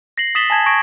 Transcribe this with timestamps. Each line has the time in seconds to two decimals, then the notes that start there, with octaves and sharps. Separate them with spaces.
0.18 A#6 C7 F#7
0.35 D#6 A6 B6 E7 F#7 G7
0.50 G#5 A5 G#6 E7
0.66 C#6 G#6 A#6 D7